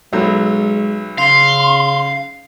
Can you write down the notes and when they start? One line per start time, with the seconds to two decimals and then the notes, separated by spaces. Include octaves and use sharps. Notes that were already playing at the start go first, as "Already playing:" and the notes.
0.13 B1 F#3 G#3 E6
1.18 C#3 F5 C6